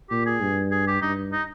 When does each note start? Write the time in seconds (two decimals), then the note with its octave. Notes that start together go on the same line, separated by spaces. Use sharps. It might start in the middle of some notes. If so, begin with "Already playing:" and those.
0.10 A#2 G4
0.26 G#4
0.41 G2
0.72 G#4
0.87 G4
1.02 G2 D#4
1.32 D#4